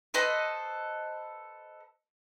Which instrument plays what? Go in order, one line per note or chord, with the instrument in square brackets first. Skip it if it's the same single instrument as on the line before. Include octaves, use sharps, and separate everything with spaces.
[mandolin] A4 B4 C5 D#5